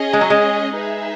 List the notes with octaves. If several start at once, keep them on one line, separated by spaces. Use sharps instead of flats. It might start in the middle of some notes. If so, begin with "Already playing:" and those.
Already playing: C#4 G#4 D#5
G#3
F#3
G#3
D#4 G#4 B4 E5